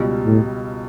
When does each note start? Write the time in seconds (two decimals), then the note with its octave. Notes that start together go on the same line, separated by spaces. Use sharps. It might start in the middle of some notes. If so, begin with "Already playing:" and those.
Already playing: C#2 B2 G3
0.26 A2